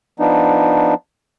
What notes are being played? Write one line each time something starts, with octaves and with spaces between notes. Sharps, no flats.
F3 B3 D4 D#4